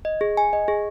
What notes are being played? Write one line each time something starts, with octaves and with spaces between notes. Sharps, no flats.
D#5
G#4
G#5
D#5
G#4